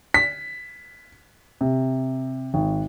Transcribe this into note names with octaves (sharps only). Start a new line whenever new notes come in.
B6
C3
G#1